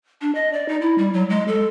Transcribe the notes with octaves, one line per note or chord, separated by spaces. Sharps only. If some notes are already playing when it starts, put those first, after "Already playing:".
D4
D#5
D5
D#4
E4
G3
F#3
G#3
A4